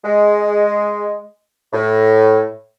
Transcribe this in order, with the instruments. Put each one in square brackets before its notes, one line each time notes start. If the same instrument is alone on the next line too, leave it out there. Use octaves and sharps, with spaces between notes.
[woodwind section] G#3
A2